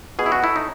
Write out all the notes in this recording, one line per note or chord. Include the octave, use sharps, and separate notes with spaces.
B2 G#4
E4
F#4
A3 E4
D#4